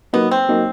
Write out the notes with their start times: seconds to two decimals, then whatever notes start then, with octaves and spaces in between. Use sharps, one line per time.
0.13 F#3 A#3 B3 D#4
0.31 C4
0.48 F#3 A#3 D#4